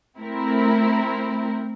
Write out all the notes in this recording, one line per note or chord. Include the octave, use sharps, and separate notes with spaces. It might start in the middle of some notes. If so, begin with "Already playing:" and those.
A3 C4 E4 A#4